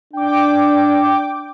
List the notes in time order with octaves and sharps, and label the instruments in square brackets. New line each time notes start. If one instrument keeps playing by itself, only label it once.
[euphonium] D4 [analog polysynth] G5 D6